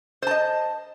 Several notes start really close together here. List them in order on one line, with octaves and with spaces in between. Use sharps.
C5 A5 D#5